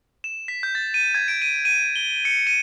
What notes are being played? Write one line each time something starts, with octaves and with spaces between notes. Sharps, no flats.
E7
B6
G6
A6
D#7
G#6
D7
D#7
D#7
G7
C#7
D#7